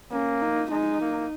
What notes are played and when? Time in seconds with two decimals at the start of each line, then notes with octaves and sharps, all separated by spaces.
0.12 A#3 C#4
0.42 D#4
0.71 G#3 D#4
1.01 A#3